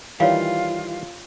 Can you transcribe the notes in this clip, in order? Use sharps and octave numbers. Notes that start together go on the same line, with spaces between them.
D#3 E3 G3 F4 C#5 F5